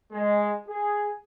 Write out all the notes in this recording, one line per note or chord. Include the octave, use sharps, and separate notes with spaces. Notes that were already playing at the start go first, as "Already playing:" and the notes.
G#3
G#4